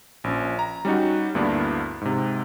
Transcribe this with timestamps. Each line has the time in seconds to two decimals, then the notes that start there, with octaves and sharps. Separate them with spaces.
0.24 A#1 C#4
0.59 A#5
0.85 G3 C#4 D#4 F#4
1.35 D2 G2 A#3 B3 D4 E4
2.01 G#2 C3